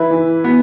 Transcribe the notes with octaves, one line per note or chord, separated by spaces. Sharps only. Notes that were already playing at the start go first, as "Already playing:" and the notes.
Already playing: E3 B4 E5
E3
B3